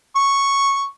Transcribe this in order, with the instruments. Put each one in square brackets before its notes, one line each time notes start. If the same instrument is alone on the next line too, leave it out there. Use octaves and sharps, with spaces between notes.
[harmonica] C#6